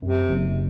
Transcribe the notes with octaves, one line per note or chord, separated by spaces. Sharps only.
F#2 C3
F#1